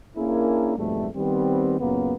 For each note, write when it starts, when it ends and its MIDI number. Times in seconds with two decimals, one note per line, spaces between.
0.17 0.74 58
0.17 0.74 61
0.17 0.74 62
0.17 0.74 64
0.17 0.74 68
0.17 0.74 70
0.77 1.08 41
0.77 1.08 44
0.77 1.08 47
0.77 1.08 55
0.77 1.08 57
1.15 1.78 51
1.15 1.78 55
1.15 1.78 59
1.15 1.78 60
1.79 2.14 42
1.79 2.14 46
1.79 2.14 49
1.79 2.14 58
1.79 2.14 59